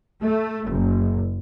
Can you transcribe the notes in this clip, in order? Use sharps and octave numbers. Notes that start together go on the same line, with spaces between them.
A3
F#1